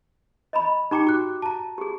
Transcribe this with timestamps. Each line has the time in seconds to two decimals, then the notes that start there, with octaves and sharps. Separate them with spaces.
0.53 D#5 A#5 B5
0.91 D#4 G4 G5 A#5 D6 C#7
1.07 F#4 D6 F#6
1.42 A5 A#5
1.78 G4 G#4